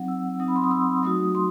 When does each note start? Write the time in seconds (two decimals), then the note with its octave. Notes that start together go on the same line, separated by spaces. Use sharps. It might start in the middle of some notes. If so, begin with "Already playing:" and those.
Already playing: F#3 C4 D#4 F#5
0.08 E6
0.40 F#3 C4 D#4 D#6
0.48 B5
0.56 C6
0.64 D#6
0.71 E6
1.03 F#3 A3 D#4 F#4 D#6
1.35 C6